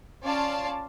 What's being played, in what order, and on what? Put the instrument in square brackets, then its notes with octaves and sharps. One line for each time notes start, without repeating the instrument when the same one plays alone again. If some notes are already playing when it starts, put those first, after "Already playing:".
[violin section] C#4 F4 D5 F5 A5